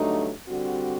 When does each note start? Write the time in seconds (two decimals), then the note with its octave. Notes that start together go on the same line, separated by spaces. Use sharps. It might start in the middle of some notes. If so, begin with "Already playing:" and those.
Already playing: G2 D3 F#3 A3 D#4
0.48 D3 G3 C4 F#4